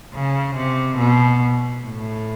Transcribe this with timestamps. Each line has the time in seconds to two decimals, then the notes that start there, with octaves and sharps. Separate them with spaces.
0.15 C#3
0.56 C3
0.98 B2
1.84 A2